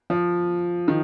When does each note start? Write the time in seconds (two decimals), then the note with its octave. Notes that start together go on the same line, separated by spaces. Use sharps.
0.10 F3
0.88 D#3